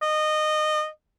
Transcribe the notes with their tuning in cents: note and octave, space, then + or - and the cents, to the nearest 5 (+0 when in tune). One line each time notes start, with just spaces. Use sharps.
D#5 -20